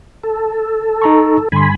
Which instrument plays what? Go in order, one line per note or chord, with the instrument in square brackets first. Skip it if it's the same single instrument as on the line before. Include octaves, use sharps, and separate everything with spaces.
[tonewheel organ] A4
[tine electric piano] D#4 A#5 C#6
[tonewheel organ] G2 G#5 B5 [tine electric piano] D3 C6